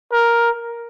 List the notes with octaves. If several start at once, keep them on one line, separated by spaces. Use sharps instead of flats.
A#4